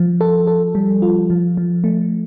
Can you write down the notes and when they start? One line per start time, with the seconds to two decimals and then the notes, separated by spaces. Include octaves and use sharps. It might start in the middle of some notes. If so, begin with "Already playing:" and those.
Already playing: F3
0.21 A4
0.47 A4
0.75 G3
1.02 F4
1.30 F3
1.57 F3
1.84 A3